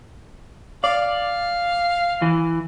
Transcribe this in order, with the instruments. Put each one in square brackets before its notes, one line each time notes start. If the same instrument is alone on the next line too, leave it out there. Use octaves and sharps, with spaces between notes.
[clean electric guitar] D5 [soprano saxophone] F5
[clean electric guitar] E3